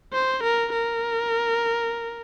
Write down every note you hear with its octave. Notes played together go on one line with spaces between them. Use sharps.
C5
A#4
A#4